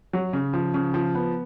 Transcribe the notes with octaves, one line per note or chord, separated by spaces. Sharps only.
F#3
C#3
F3
C#3
F3
B3